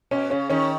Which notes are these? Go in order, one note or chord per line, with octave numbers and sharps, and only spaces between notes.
B2 C#4
C#3 C#4
D#3 C#4